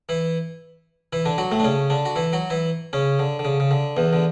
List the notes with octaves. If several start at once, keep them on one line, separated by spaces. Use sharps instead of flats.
E3 E4
E3 E4
D3 D4
F#3 F#4
A2 A3
D4
C#3 C#4
D3 D4
F#4
E3 E4
F#3 F#4
E3 E4
C#3 C#4
D3
D3
C#3
C#3
D3
E2 E3
D3